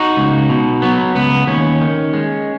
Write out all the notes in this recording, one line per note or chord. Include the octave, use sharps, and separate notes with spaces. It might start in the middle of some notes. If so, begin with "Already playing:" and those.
Already playing: D#4 F#4
C#2
B2
F#3 B3
C#2 B3
D#2 C#4
D#3
G#3